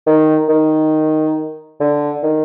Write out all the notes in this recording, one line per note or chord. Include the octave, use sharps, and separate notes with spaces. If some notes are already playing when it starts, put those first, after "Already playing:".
D#3
D#3
D3
D#3